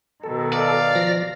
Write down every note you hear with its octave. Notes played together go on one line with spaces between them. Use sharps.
B2 D#3 A4
D5 F5
F3 A#6